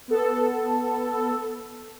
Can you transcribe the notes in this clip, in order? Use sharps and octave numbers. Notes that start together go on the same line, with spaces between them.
B3 A4